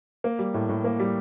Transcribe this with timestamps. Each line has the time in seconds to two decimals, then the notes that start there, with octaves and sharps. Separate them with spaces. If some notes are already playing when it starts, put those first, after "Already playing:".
0.24 A#3
0.39 G3
0.54 A2
0.69 A2
0.84 A#3
0.99 G3